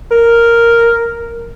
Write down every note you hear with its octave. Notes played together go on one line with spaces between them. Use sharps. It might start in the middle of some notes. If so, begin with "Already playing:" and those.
A#4